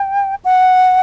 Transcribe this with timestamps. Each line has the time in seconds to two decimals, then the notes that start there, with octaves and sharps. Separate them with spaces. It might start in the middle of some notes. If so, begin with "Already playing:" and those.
Already playing: G5
0.45 F#5